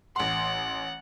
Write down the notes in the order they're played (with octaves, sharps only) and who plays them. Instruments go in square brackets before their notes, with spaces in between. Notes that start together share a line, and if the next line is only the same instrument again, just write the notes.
[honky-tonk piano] A1 C6 [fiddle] F#5